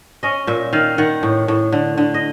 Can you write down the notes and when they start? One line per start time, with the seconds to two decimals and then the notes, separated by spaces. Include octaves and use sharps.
0.23 C#4 D#5
0.47 A#2 E5
0.73 D#3 F5
0.98 D#3 F#5
1.23 A2
1.48 A2
1.72 D3
1.98 D3
2.14 D#5